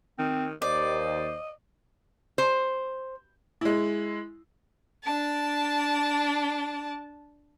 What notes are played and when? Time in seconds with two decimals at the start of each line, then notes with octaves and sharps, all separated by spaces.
0.18 D#3 C4
0.62 D#2 C5 D5 D#5
2.38 C5
3.61 G#3 E4
5.04 D4 A5